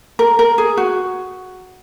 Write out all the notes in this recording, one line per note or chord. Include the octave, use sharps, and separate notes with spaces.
A#4
A#4
G#4
F#4